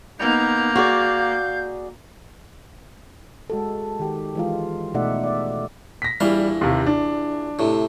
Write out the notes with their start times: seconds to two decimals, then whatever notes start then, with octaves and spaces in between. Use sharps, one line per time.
0.19 A#3 B3 D#4 G6
0.76 F#4 G#4 D5 F5
3.50 G#3 F#4 A4
3.99 D#3 G4
4.35 E3 G#3 F4
4.94 B2 A3 D#4 D5 E5 F#5
5.23 D5 E5
6.02 A#6 B6
6.20 A#1 E3 G3 F5
6.61 D#2 C3
6.86 D4
7.59 A2 C3